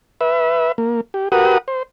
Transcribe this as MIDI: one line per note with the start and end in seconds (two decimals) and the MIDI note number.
0.21 0.72 71
0.21 0.72 76
0.78 1.01 58
1.14 1.29 67
1.32 1.58 66
1.32 1.58 67
1.32 1.58 70
1.32 1.58 71
1.32 1.58 78
1.32 1.58 87
1.68 1.83 72